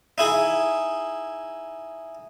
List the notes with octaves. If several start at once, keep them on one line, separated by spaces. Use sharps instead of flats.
D#4 E4 G#4